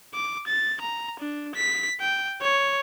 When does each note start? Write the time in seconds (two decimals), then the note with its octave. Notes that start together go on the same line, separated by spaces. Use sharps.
0.14 D6
0.47 A6
0.81 A#5
1.20 D4
1.56 B6
2.01 G5
2.41 C#5